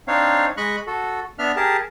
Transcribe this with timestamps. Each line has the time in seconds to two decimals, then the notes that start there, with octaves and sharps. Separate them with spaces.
0.08 C4 D4 D#4 C#5 F5
0.57 G#3 D#5 B5 C#6 F#6
0.87 F#4 A4
1.39 B3 D4 E5 F6
1.56 G4 G#4 A#4 A5